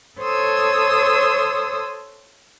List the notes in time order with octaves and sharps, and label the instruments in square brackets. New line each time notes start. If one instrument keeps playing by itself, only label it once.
[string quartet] A4 C5 C#5 D#6 E6